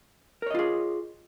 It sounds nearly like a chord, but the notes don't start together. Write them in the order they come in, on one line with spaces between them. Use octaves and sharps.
A#4 C#5 D#5 F4 G#4